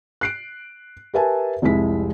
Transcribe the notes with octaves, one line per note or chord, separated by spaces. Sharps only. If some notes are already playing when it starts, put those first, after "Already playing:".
F#6 C7 D7
G4 A#4 B4 E5 G#5 A5
F1 C2 G#3 E4 B6